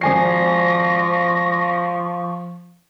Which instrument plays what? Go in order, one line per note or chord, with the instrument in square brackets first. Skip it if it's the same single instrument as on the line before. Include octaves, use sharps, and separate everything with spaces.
[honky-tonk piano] G#1 G#5 C7 [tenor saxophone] F3 [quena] C#6 [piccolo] A#6